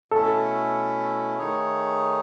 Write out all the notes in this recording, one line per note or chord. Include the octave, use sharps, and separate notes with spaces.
B2 A3 C#4 E4 A4
D#3 A3 D#4 G#4 C#5